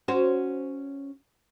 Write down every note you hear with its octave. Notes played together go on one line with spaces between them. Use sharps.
C#4 F#4 C5